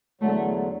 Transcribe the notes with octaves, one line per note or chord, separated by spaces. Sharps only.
E2 D3 F#3 A3